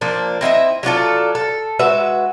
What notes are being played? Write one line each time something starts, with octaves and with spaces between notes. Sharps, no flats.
F3 A#3 D4
C4 E4 D#5 E5
F#3 D4 F4 A4
A4
G#3 F#4 B4 E5